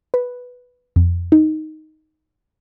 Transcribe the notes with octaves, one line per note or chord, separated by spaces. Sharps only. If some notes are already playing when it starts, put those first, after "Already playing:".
B4
F2
D#4